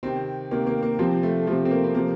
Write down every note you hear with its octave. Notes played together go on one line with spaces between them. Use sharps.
C3 D#3 C4
C3 D#3 A#3
A#3
A#3
C3 F3 C4
A3
C3 F3 A3
C4
A#3
C4
C3 F3 A#3